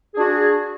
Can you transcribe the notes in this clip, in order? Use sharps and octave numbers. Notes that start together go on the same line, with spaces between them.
D4 F#4 G#4